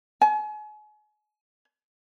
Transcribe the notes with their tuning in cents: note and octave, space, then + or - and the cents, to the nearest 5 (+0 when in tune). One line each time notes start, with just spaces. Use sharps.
G#5 +35